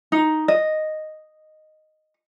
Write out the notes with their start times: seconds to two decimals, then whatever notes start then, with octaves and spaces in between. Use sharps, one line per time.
0.12 D#4
0.48 D#5